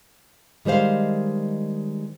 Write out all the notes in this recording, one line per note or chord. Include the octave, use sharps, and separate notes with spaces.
D#3 G3 G#3 C5 F5